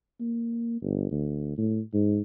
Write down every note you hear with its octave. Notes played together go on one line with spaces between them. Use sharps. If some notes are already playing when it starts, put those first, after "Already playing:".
A#3
G1
D2
A2
G#2